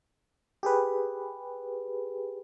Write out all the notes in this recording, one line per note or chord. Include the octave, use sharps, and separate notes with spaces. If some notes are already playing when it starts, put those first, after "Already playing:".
G4 G#4 B4